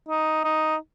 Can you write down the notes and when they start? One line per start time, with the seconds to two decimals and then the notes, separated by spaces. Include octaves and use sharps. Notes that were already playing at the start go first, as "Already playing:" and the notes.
0.08 D#4
0.44 D#4